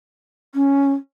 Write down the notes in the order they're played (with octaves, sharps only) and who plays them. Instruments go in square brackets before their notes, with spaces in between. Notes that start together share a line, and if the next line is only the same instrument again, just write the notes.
[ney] C#4